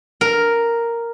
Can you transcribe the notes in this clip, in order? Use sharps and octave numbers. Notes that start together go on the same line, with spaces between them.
A#4